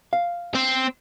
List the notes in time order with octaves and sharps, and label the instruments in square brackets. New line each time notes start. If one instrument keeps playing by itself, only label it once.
[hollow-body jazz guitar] F5
[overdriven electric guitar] C4